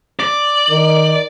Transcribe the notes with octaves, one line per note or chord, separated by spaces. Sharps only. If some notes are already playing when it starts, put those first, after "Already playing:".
D5
D#3